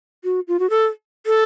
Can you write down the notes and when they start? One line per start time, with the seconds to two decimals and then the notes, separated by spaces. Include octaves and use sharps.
0.24 F#4
0.48 F4
0.59 F#4
0.70 A4
1.26 A4